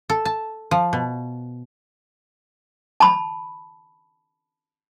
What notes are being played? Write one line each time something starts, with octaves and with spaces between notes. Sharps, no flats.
A4
A5
F3
B2
A5 B5